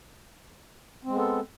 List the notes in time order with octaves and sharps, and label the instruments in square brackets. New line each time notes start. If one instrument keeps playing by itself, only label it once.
[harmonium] C4
G#3
B3
A4